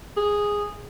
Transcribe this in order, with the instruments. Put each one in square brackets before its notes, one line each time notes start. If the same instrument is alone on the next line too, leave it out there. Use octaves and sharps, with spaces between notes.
[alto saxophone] G#4